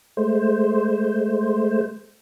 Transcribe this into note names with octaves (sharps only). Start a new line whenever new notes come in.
G#3 A3 C5